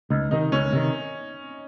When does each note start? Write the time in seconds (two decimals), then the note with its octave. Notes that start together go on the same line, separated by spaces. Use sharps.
0.10 C#2 D#4
0.31 C3 D#3 D#4
0.52 C#2 C#4
0.73 C3 D#3